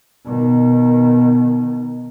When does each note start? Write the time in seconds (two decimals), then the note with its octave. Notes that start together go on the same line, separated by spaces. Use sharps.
0.25 B2 D#3